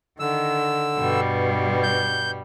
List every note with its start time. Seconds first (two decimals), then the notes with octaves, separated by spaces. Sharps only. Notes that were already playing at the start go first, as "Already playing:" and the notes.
0.20 D3 D#3 E6
0.97 G2 B2 G3
1.83 G6